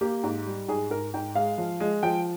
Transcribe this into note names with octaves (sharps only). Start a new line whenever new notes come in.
A#3 G4
G#2
G3
G#2 G#4
G#2 A#4
G#2 G5
G#3 F5
F3
G#3
F3 G5